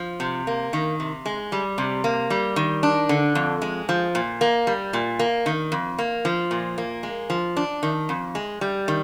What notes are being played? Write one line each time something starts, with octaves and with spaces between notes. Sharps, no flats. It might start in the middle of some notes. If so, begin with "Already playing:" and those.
Already playing: F3
C3
A#3
D#3
C3
G#3
G3
C3
A#3
G3
D#3
D4
D3
F2
G#3
F3
A#2
A#3
G3
A#2
A#3
D#3
F2
A#3
F3
A#2
A#3
G#3
F3
D4
D#3
F2
G#3
G3
D#3